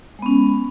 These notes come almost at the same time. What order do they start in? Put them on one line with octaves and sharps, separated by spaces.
G#3 B3 C#4